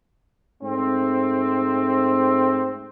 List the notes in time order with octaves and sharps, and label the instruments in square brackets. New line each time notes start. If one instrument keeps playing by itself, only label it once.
[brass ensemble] G#2 A3 C4